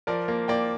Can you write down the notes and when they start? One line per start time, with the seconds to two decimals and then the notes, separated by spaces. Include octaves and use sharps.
0.07 F3 A#4 D5
0.28 A#3
0.48 A#3 D5 G5